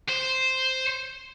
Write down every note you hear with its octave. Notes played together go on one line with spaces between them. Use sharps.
C5